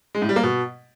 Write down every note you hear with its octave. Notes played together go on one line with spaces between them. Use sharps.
G#3
A2
G3
A#3
B2